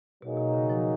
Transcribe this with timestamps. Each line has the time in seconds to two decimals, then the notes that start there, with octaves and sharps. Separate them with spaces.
0.22 B2 F#3 A#3 D#4 G#4
0.37 B2
0.54 C#3
0.70 F3